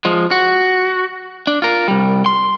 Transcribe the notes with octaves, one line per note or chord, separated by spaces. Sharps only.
F3 G#3
F#4
D4
F4 A#4
C2 G3
C6